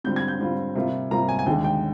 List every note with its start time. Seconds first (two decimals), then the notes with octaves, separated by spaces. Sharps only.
0.04 D3 G3 C4 F4 G6
0.16 G#6
0.28 G6
0.40 D3 G3 C4 F4
0.75 C3 G3 A#3 F4
1.11 C3 G3 A#3 F4 A#5
1.29 G#5
1.39 G#5
1.46 D#2 D3 G#3 G5
1.64 G5